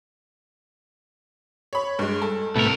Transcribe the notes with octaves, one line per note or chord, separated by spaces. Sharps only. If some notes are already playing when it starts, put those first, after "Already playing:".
C#5 B5
G2 G#3
A4
C2 A2 A3 B3 A#4